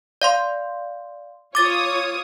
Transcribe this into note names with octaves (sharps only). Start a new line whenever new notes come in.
D5 F5 C6
F4 C#5 D6 D#6 A6